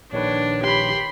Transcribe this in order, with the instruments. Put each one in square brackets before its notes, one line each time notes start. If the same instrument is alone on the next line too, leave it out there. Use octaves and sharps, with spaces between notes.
[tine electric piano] A#1 D#3 B4 [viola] D4 [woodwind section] C#5
[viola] G4 [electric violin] B5 C6